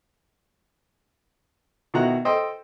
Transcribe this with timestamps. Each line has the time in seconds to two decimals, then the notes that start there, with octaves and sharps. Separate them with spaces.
1.94 B2 D#3 E4 F#4 A#5 F#6
2.25 A4 C5 D#5 G5